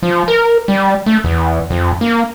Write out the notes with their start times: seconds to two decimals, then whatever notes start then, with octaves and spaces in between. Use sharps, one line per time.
0.03 F3
0.28 A#4
0.68 G3
1.06 A3
1.24 E2
1.70 F2
2.01 A#3